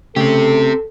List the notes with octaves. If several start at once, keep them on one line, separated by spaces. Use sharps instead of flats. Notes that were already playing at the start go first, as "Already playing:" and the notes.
C#3 A3 C4 G4 A4